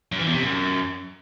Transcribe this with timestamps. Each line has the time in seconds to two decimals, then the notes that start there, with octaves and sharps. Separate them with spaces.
0.12 F#2
0.19 E3
0.27 E2
0.34 C3
0.42 F#2